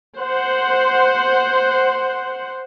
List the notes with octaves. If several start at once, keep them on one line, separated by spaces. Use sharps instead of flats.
C5 F#5